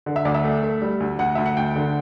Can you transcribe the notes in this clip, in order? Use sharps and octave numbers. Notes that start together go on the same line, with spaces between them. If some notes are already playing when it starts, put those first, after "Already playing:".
D3
E5
D2 D5
E5
A3
A3
G3
D2
D2 F#5
D2 E5
F#5
D2 G5
D3